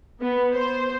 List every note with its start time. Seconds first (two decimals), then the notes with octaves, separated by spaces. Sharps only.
0.21 B3
0.53 C5